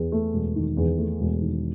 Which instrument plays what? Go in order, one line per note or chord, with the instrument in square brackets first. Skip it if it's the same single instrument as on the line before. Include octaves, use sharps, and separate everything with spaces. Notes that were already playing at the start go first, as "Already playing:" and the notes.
Already playing: [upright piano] E2
A3
E1
D#3
E2
A3
E1
D#3